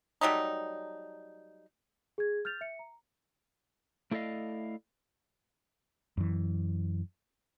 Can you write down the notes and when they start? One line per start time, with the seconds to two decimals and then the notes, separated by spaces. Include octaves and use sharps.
0.21 F#3 G3 A3 D#4
2.18 G#4 G#6
2.45 F6 G6 A6 F7
2.61 E5 C#7
2.79 A#5
4.11 A3 E4 A4 D5 D#5 F5
6.17 F#2 E3